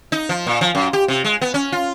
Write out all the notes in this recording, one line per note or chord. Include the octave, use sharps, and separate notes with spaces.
D#4
F3
A#2
F3
F#2
G4
C3
G#3
B3
C#4
F4